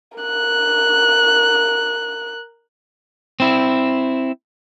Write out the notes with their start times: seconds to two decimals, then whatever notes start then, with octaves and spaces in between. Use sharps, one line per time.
0.18 A#4 F#6
3.40 C4 E4